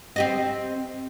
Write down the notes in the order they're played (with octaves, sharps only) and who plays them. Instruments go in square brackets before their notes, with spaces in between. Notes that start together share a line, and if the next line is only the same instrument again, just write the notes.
[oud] C4 G4 D#5